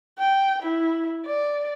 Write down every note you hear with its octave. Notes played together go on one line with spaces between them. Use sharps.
G5
E4
D5